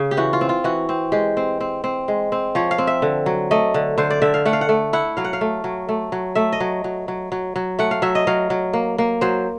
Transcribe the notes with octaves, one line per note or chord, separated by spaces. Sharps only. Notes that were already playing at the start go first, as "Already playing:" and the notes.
Already playing: C#3
G4
E3 F#4
F4
C4
F4
E3 F#4
C4
G#3 G4
C4
C4
C4
G#3
C4
F3 C#5
F5
C4
E5
D3
F#3
A3 D#5
D3
D3 C5
D5
D3 E5
F5
A3 F#5
F5
F#5
A3
E4 F#5
F#3 F5
F#5
F5
A3
F#3
A3
F#3
A3 E5
D#5
F#3
F#3
F#3
F#3
F#3
A3 F#5
F5
F#3 E5
D#5
F#3 F5
F#3
A#3
A#3
F#3 C5